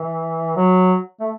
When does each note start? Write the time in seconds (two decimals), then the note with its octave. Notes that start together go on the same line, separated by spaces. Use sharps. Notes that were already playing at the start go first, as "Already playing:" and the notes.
Already playing: E3
0.56 F#3
1.20 A3